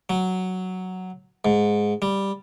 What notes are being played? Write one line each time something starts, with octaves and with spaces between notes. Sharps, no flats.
F#3
G#2
G3